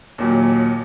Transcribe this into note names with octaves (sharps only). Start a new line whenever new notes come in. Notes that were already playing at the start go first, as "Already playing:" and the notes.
D#2 A#2 F#3